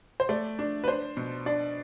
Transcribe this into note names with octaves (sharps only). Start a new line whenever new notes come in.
C5
A3 D5
D4
B4
D4 C5
B2
D4 D5